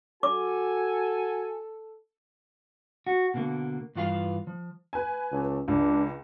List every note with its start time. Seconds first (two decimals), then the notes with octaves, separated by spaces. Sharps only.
0.23 F#4 A4 G#5 D6
3.07 F#4
3.34 B2 D3 A#3
3.95 G2 E3 F4 G#4 F5
4.47 F3
4.93 B4 G#5
5.32 C#2
5.68 C#2 D4